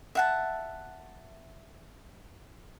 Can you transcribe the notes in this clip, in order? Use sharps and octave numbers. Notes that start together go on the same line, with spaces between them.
E5 F#5 A5